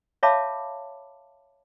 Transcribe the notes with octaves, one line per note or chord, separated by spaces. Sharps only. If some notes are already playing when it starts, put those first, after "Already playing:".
C#5 E5 F5 A5 B5 D6